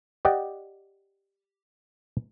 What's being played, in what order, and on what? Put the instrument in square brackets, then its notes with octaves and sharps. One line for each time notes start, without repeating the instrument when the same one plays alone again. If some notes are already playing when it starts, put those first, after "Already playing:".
[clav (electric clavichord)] G4 D5 D#5 F#5 G5